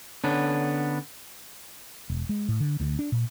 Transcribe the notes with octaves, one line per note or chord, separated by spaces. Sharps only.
D3 B3 C#4 D4
E1
G#3
A2
D3
D2
D4
A#2